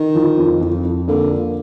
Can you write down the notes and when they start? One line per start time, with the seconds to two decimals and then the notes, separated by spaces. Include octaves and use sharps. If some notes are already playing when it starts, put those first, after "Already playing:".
Already playing: D#3
0.15 F3
0.38 F2
0.61 F2
0.85 F2
1.08 D3 A#3
1.31 F4